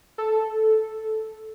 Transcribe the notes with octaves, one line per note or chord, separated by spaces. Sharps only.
A4